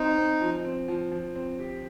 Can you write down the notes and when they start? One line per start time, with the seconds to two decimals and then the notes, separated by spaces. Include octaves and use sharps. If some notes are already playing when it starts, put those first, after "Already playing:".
Already playing: C4 D#4
0.17 C4
0.41 F3
0.65 C4
0.88 F3
1.11 F3
1.35 C4
1.59 G4